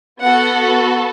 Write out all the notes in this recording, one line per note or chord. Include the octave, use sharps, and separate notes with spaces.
B3 F#4 A4 F#5